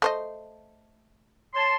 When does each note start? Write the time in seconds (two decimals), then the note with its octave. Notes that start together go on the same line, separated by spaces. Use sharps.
0.02 A3 C5 D#5
1.54 C#5 A5 C6